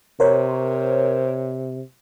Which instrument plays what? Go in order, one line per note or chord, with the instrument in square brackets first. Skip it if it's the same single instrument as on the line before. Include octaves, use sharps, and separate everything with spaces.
[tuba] C3 [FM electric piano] A#4 C5 C#5